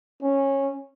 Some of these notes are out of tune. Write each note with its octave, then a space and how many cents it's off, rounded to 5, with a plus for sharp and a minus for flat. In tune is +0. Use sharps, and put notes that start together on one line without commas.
C#4 -15